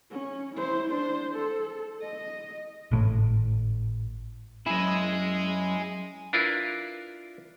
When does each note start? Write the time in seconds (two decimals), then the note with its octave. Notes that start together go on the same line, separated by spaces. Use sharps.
0.10 C#4
0.56 E4 C5
0.90 D4 C5
1.34 A4
2.02 D#5
2.91 G#1 A2
4.66 F#2 E4 G#4 D#5
6.33 D4 E4 F4 A#4 B4